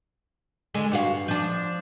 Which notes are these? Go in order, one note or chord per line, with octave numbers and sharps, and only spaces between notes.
D3 G#3
G2 F#4 F5
F3 D4